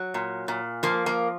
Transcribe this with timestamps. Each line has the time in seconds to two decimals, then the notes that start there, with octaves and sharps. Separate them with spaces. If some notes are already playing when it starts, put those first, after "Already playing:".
Already playing: F#3
0.14 A#2
0.48 A#2
0.83 F3 A#3
1.06 A#3